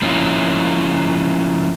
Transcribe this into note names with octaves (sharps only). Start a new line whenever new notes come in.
F3 A#3 C#4 D#4 E4